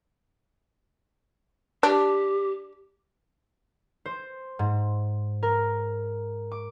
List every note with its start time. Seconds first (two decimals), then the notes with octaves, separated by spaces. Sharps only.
1.83 D4 G4
4.06 C5
4.59 G#2
5.43 A#4
6.51 D6